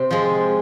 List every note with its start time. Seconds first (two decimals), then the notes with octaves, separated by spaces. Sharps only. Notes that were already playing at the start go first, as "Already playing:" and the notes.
Already playing: C3 C4
0.11 F3 G#3